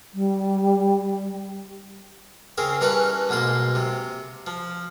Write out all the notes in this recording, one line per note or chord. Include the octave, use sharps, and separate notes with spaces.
G3
C#3 C4 G#4 A#4
G2 E3 C#4 A#4 B4 A#5
B1 G#2 A#3 F4 C6
C3
F3